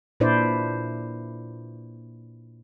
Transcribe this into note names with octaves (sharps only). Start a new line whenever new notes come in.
A#2 D4 E4 B4 C5 D5